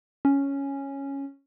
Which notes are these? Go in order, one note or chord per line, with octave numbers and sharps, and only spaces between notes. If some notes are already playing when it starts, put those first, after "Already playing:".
C#4